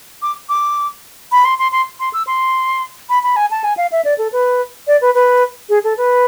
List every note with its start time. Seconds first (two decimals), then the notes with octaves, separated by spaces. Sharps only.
0.22 D6
0.49 D6
1.32 B5
1.45 C6
1.59 C6
1.72 C6
2.00 C6
2.13 E6
2.27 C6
3.09 B5
3.23 B5
3.36 G#5
3.51 A5
3.64 G#5
3.77 F5
3.92 E5
4.05 D5
4.18 A4
4.33 B4
4.87 D5
5.01 B4
5.15 B4
5.69 G#4
5.84 A4
5.98 B4